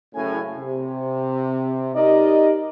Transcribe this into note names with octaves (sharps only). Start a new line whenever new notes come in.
F#1 A2 C#3 G#5
C3
D#4 G4 A#4 D5 D#5